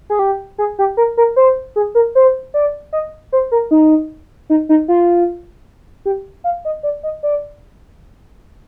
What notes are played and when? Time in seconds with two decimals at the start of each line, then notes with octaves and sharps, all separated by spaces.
0.10 G#4
0.19 G4
0.58 G#4
0.79 G4
0.97 A#4
1.17 A#4
1.36 C5
1.76 G#4
1.95 A#4
2.15 C5
2.54 D5
2.93 D#5
3.32 C5
3.52 A#4
3.71 D#4
4.50 D#4
4.69 D#4
4.88 F4
6.05 G4
6.44 F5
6.65 D#5
6.83 D5
7.03 D#5
7.23 D5